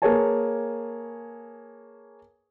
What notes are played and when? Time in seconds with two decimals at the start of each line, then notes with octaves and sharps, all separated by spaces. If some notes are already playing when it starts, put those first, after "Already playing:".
0.02 A#3 G#4 B4 C#5 G#5 A5